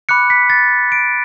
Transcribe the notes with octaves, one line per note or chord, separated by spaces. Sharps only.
B5 D6 F#6 C#7
B6
A6
D7